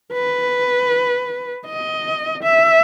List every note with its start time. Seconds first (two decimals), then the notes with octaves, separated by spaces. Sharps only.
0.13 B4
1.67 D#5
2.43 E5